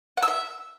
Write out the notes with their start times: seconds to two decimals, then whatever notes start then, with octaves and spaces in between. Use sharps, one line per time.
0.17 F#5
0.23 E6
0.28 E5